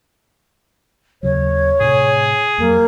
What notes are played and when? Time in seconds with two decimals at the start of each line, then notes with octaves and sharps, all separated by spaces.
1.23 D#2 C#3 F#3 C#5
1.81 A2 C3 G#4
2.58 F2 F#3 A#3